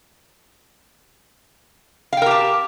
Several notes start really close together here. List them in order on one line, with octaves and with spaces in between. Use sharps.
F5 G5 A#4 G4 A5